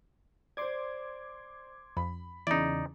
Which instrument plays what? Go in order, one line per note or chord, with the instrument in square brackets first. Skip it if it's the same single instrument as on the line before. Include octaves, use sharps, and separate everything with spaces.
[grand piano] C5 D5 [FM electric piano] C6 D6 G#6
[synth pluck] F2 [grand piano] B5
[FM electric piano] E2 C#3 [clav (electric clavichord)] D#4 D5 [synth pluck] E4